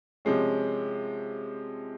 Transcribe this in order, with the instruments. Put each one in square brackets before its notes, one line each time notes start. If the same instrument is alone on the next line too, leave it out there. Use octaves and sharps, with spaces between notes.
[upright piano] C3 F3 G#3 C#4